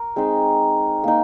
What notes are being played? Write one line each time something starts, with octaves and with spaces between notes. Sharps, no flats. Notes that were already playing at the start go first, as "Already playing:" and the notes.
Already playing: A#4
G#3 C4 D#4
A#3 D#4